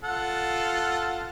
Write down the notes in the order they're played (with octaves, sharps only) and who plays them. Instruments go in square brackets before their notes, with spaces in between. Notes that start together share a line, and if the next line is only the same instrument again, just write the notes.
[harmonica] F4 A4 F#5